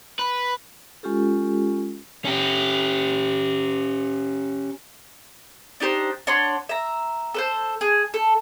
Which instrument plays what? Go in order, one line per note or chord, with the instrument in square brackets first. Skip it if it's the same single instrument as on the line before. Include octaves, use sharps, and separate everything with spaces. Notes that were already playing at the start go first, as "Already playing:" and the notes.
[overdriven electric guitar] B4
[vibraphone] G#3 C#4 F4 G4 A4
[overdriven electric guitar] C#4 G4
[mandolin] D4 D#4 G4 C5
D4 C#5 F#5 C6
E5 A#5
A4 B4 C5
G#4
A4